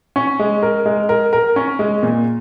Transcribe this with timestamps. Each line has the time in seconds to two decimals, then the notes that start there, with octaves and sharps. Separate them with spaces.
0.16 C#4
0.39 G#3
0.63 A#4
0.86 G#3
1.09 A#4
1.33 A#4
1.56 C#4
1.79 G#3
2.03 A#2